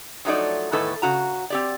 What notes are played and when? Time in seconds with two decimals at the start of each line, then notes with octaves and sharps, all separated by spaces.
0.25 F3 F#3 A3 D#4 D5
0.72 E2 A2 D#3 A4 B4
1.02 C#3 F#4 A#5
1.50 C4 G4 D5